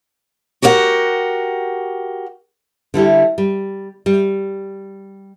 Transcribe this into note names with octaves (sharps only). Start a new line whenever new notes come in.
F#4 G4 A#4 D#5 F#5
D3 G3 E4 G4
G3
G3